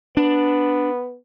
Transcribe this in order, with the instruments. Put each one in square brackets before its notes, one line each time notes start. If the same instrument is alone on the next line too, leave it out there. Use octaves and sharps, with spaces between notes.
[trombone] B3 [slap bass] D4